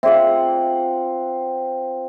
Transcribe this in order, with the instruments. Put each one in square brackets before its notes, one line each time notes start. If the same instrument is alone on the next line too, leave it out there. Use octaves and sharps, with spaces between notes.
[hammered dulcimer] C4 F4 F#5 [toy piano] G#4 D5 E5